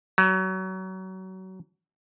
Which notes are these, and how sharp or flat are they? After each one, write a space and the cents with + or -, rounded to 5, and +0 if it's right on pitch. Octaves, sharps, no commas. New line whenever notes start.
F#3 +25